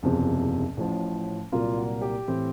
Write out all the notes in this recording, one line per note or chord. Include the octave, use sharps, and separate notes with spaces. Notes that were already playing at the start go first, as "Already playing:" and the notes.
F#1 E2 C3 F3
A1 A2 F3
C2 A#2 F#3 A#3 F4
F#4
G4
A2 E3 A3 C4 E4